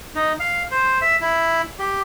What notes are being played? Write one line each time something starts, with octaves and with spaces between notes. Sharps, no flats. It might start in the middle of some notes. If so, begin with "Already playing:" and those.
D#4
F5
C5
E5
E4
G4